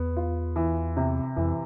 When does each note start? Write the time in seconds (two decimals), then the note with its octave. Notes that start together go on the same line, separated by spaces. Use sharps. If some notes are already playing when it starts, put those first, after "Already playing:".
Already playing: E2 B3
0.17 F4
0.56 E3
0.97 C3
1.36 F2 E3